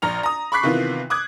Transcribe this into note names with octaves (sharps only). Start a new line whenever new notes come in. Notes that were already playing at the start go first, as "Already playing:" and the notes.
A#1 A#5 F6 F7
A#5 D#6
B5 C#6 D6 F#6 B6 C7
C3 D#3 E3 B3 F4
D6 D#6 F#6 G#6